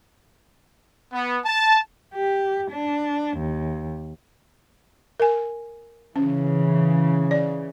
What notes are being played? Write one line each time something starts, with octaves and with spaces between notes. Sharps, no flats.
B3
A5
G4
D4
D#2
A#4 G#5
C#3 E3 C#4
D5